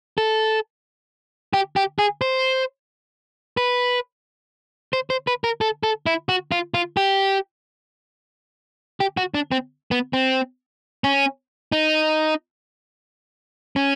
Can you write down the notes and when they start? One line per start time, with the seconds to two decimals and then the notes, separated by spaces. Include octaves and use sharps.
0.18 A4
1.53 G4
1.76 G4
1.99 G#4
2.21 C5
3.57 B4
4.93 C5
5.10 C5
5.27 B4
5.44 A#4
5.61 A4
5.83 A4
6.06 E4
6.29 F#4
6.52 F4
6.74 F4
6.97 G4
9.00 G4
9.17 F#4
9.34 D4
9.52 C4
9.91 B3
10.13 C4
11.04 C#4
11.72 D#4
13.76 C#4